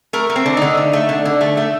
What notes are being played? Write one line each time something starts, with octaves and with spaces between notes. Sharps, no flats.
A3 A#4
A3
C4
D3
D3 D#4
A3
A3
D3
D3
A3
A3